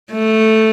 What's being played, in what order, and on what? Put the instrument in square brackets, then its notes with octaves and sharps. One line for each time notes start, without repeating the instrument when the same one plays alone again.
[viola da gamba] A3